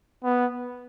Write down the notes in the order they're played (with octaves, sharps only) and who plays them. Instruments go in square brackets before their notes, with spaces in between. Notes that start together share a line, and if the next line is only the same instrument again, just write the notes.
[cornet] B3